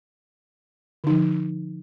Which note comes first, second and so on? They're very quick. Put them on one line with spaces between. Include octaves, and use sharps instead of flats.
D3 D#4 F3